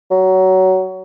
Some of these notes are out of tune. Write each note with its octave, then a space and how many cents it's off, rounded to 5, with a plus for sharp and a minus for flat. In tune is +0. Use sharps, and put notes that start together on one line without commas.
F#3 +20